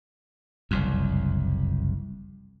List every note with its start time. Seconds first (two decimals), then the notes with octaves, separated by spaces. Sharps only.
0.71 F#1 C2 F2